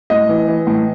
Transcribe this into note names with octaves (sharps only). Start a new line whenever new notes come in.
A2 D#5
E3
E3
A2